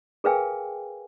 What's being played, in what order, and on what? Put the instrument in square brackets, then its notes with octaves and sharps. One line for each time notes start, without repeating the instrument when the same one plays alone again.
[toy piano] G#4 A#4 B4 F5 G5 G#5